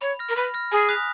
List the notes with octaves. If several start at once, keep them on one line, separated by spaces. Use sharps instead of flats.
C#5 B5
F6 A#6
A#4
B4 B5
F6 A#6
G#4 G#5
D#6 F#6 B6 F7